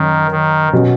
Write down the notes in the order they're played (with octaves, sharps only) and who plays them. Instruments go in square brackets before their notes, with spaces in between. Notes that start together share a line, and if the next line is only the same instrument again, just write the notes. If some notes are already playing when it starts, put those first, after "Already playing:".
Already playing: [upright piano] F#2 [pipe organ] D#3
[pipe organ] D#3
[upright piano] B2 F#3 C#4 F#4